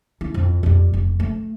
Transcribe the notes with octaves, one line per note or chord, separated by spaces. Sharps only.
E4
F2
F2 G3
F1
A3